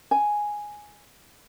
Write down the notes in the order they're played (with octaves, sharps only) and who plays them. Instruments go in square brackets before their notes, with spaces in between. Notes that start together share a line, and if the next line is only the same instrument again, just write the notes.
[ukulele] G#5